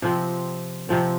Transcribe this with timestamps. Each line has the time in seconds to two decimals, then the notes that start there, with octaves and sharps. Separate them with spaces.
0.02 C3 F3 C4
0.89 C3 F3 C4